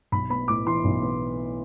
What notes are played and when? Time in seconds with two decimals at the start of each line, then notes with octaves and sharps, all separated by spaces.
0.12 B1 B5
0.30 B3 B5
0.48 A2 D6
0.66 E3 C6
0.84 B1
1.03 B3